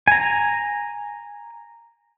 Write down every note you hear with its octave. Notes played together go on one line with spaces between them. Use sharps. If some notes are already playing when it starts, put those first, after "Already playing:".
G#5 A#5